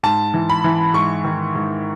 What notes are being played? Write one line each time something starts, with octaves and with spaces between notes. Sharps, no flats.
G#2 A5
E3
B5
E3
G#2 C#6
D#3
G#2